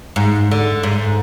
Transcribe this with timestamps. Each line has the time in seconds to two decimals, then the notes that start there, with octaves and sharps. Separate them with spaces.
0.16 G#2
0.51 D3
0.83 G#2